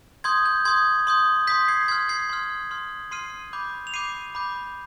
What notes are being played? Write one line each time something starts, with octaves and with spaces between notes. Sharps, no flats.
C6 D#6 G6 G#6
G6
C6 D#6 G6 G#6
C6 D#6 G6
C6 D#6 G6 B6
G#6 C7
B6
C6 F6 G#6
G#6 C7
C6 F6
C6 F6
C6 F6 C7 D#7
B5 D6 G6
F7
B5 D6 G6 C7 D#7
B5 D6 G6